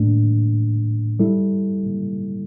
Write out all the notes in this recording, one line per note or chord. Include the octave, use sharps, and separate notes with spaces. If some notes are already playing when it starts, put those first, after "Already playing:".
Already playing: A2 A3 D4
G3 E4 A4